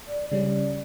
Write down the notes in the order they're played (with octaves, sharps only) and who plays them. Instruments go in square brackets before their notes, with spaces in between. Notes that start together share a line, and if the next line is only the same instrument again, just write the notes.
[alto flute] D5
[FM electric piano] C#3 G3 C#4 [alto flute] D5